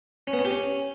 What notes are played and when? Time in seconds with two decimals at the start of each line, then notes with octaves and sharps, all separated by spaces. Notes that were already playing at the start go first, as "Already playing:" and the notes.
0.27 C#4
0.33 B3
0.39 C#4
0.45 G4
0.51 C#4